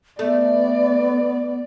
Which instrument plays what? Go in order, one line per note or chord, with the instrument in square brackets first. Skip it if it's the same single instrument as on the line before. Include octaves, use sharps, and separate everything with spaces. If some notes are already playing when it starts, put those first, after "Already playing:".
[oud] A3 [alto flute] B3 [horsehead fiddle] D5